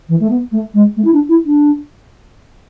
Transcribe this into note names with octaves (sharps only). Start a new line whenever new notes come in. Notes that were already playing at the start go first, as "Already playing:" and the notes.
E3
A3
B3
A3
G#3
A3
E4
D4
E4
D4